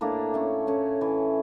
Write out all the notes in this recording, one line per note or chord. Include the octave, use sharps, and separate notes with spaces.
A2 A#3 D4
A3 C#4
A2 C#4
E3